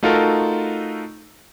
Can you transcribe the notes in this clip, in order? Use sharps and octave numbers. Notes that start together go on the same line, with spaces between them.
A3 D#4 F4 F#4 A4 A#4